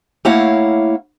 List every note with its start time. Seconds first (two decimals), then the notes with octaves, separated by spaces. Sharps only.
0.25 A3 A#3 E4 C#5 F5 F#5